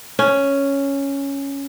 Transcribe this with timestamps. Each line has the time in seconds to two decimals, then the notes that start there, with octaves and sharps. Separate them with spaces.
0.19 C#4